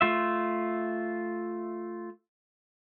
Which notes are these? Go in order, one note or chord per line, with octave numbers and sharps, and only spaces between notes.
A3 F4 E5